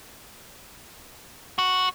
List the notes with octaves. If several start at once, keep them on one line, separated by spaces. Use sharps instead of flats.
F#4